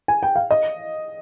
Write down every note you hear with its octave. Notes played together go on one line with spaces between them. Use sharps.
G#5
G5
F5
D#5